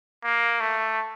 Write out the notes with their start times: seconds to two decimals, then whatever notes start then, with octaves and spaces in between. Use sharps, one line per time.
0.24 A#3
0.60 A3